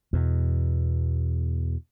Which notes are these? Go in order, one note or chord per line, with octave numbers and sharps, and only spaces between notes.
E2 B2